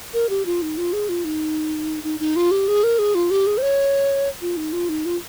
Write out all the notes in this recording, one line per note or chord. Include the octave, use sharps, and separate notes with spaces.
A#4
G4
F4
D#4
F4
G#4
F4
D#4
D#4
D#4
F4
G4
G#4
A#4
G#4
F4
G4
G#4
C5
C#5
F4
D#4
F4
D#4
F4